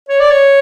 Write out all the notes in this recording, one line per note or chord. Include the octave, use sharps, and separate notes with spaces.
C#5
D5
C#5